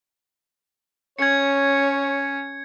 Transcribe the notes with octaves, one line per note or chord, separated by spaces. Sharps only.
C#4 C#5 G#6 C#7